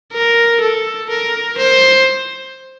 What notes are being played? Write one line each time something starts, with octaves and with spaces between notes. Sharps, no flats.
A#4
A4
A#4
C5